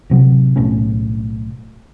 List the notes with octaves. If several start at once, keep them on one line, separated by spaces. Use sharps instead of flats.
D1 C3 F#3
D1 B1 A2 C#4